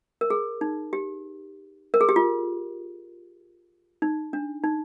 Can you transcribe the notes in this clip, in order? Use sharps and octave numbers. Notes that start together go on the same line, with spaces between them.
A#4
G#4
D#4
G4
A#4
G#4
G4
F4
D#4
D4
D#4